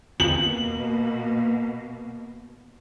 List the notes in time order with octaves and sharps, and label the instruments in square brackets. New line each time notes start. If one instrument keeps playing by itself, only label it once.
[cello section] B2 A#3 [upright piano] F#7